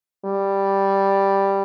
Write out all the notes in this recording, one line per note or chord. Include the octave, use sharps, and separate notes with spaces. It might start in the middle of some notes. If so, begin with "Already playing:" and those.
G3